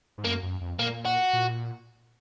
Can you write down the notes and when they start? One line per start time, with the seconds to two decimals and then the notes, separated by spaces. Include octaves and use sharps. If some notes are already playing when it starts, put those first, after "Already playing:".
0.18 G#2
0.25 F#2 A#3
0.43 F#2
0.61 F2
0.79 A#2 A#3
1.05 F#4
1.33 A#2